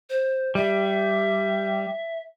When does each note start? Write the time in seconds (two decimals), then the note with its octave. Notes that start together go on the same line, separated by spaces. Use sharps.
0.10 C5
0.55 G3 E5